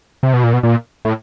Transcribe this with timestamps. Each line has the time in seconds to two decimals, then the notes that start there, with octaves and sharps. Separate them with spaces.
0.23 C3
0.33 B2
0.44 A#2
0.53 B2
0.63 A#2
1.05 A2